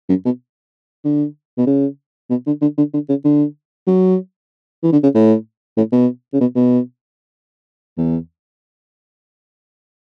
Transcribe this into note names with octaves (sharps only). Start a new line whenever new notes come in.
F#2
B2
D3
B2
C#3
B2
D3
D3
D3
D3
C#3
D3
F#3
E3
D3
C#3
A2
A2
B2
C#3
B2
B2
E2